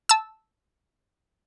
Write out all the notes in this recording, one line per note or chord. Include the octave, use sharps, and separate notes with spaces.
A5 E6